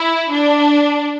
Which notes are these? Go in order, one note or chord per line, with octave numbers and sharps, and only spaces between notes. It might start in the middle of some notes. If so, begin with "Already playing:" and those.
Already playing: E4
D4